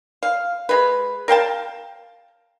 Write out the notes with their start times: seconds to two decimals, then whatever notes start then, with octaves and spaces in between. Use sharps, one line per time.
0.23 F5
0.69 G#3 B4
1.28 A#4 F5 G5 A5